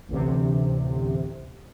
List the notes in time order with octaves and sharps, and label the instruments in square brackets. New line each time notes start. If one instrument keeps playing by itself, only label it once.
[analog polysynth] A1 D2 C3